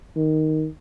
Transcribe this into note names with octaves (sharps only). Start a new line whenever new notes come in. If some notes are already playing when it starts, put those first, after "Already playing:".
D#3